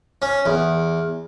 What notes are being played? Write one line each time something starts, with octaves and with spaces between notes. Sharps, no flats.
C#4
E2